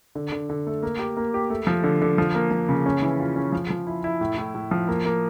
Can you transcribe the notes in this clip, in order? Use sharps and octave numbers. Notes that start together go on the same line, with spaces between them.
D3
D3
D3
A3
A#3
G4
A#3
G4
A3
F3
D3
D3
F3
A#3
F3
C#3
C#4
E3
F4
C#4
F3
F3
E4
E4
A2
A2
A2
F3
A#3
A#3